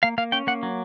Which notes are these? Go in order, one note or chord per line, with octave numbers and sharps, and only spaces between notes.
A#3 F5
A#3 F5
C#4 G5
A#3 F#5
F#3